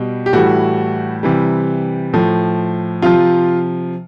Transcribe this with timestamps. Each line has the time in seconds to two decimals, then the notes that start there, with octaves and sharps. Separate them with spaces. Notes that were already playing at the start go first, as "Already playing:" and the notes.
Already playing: B2 G3
0.26 G4
0.33 A2 E3 G3 F#4
1.23 C3 E3 G3
2.13 A2 F3
3.02 C3 F3 F4